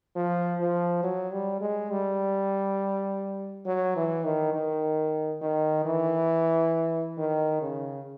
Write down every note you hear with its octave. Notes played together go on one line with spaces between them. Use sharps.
F3
F3
F#3
G3
G#3
G3
F#3
E3
D#3
D#3
D#3
E3
D#3
C#3